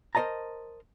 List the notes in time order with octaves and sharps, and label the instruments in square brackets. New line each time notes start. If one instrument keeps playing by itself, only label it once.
[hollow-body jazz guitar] A#4 C5 C#5 D#5 A5 A#5